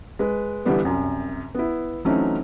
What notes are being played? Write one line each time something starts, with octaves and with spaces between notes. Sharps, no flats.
G#3 B4
D3 E3 G3 B3
C2 F#2
B3 E4
E3 F#3 A3 C4 C#4 D#4